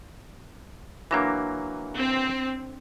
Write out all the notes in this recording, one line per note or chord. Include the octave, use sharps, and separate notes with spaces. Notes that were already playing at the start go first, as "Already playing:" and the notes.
E3 F#3 A#3 D4 A#6
C4